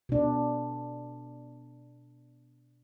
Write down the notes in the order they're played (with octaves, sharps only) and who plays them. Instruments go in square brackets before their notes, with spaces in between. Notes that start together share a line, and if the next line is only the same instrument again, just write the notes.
[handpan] B2 D4